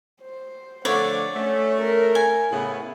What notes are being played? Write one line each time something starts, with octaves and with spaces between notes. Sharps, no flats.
C5
D3 F3 A3 C#5 D5 F#5
A3 C#4
A#4
G#5
A2 C#3 B3 E4